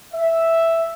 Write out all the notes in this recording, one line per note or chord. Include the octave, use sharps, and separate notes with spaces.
E5